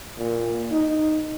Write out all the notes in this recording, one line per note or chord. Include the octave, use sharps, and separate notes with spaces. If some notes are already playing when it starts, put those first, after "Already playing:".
A#2
D#4